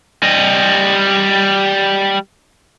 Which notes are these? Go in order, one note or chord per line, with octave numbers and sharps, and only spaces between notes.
G3 D#5